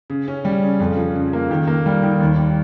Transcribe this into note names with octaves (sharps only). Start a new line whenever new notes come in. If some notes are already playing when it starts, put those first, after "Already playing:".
C#3
C#4
G3
C#3
F2
F3
C#3
A#3
D#3
A#3
G3
D#3
D#2
G3